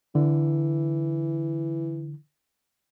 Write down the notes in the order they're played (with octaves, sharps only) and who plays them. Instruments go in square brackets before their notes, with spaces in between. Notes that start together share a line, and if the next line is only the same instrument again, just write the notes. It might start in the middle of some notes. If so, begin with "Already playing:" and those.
[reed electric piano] D3 [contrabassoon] E3